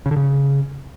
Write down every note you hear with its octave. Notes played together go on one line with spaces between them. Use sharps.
C#3
D3
C#3